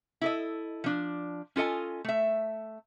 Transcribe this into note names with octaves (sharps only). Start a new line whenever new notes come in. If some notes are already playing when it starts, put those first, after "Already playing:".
E4 A4 D#5
F3 D4
C#4 F4 A4 D#5 G#5
A3 E5